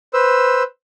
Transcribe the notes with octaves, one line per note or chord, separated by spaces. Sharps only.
B4 C5 E6